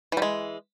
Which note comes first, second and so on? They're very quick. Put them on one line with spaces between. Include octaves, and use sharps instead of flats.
E3 G3 G#3